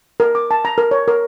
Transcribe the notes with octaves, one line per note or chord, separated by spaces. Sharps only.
A#4
D6
A5
A#5
A#4
C#5
A#4